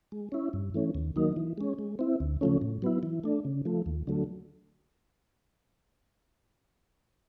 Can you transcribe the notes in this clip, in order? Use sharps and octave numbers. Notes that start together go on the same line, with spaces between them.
G#3
C#4 E4
G2
E3 A3 C#4
D#2
D#3 F#3 A#3 D#4
E3
G#3 C#4
G#3
C4 E4
D2
C#3 F3 A3 C#4
A2
F#3 B3 E4
E3
A3 D4
C#3
F3 A3
D#2
D3 F#3 A3